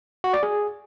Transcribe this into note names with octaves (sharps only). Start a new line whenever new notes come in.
F#4
D5
G#4